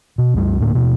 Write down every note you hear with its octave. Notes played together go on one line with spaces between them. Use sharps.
B2
C2 F#2 G3
D2 A2 A#3
D#2 B2